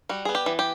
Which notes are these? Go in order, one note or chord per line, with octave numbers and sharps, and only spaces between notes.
G3 F#4
G#4
B3
G4
E3
G4